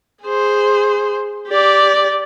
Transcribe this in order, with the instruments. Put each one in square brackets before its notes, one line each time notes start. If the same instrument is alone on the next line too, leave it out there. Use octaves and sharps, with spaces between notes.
[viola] G#4 C5
G4 D5